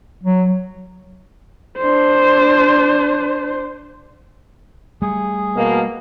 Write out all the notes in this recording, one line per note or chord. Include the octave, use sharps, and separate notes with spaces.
F#3
D4 C5
G3 A3 G#4
B2 A#3 B3